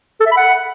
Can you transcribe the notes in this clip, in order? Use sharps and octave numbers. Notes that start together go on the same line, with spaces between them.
A4
E5
B5
F#5